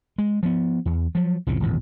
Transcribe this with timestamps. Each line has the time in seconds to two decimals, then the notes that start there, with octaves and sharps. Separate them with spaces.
0.18 G#3
0.43 F3 B3
0.86 E2
1.15 F3 F#3
1.47 C2 F2 A2 C#3
1.60 D1 G#1 E2 B2